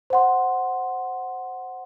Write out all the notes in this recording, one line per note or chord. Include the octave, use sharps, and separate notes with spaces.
C5 F#5 C6